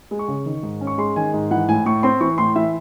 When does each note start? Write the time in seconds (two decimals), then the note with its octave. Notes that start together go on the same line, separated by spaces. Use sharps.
0.11 G#3
0.19 C#6
0.28 C#3
0.46 D#3
0.63 G#2
0.81 C#4
0.87 C#6
0.98 G#3 C6
1.16 D#3 G#5
1.34 G#2
1.51 E3 F#5
1.69 A2 G#5
1.86 A2 C#6
2.03 C4 C6
2.21 E3 C#6
2.38 A2 C6
2.56 E3 E5